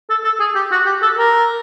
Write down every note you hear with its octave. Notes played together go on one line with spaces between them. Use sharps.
A4
A4
G#4
G4
F#4
G4
A4
A#4